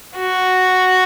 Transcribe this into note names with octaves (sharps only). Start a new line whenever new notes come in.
F#4